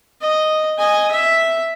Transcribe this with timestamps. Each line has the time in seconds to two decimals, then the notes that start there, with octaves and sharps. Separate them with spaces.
0.21 D#5
0.78 D#5 G#5
1.11 E5